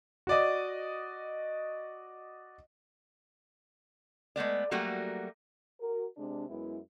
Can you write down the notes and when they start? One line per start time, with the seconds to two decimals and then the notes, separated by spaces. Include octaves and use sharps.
0.27 F#4 D5 D#5
4.36 G#3 A3 B3 D5
4.71 F#3 G3 A3 A#3 F#4
5.81 F#4 A#4
6.17 C3 G#3 D4
6.49 F#2 G#3 B3 E4